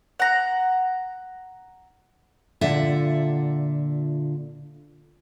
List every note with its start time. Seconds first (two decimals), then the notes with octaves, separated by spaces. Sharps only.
0.19 F#5 A#5
2.61 A#2 D3 F4 E5 F#5